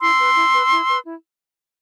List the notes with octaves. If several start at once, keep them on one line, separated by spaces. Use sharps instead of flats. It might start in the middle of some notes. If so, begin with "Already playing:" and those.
E4 C6 E6
B4
E4
B4
E4
B4
E4